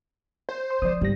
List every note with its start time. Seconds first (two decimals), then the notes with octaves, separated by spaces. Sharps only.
0.49 C5
0.70 C6
0.82 F3 D5 D#6
1.01 G#2 C#3 G3 A#6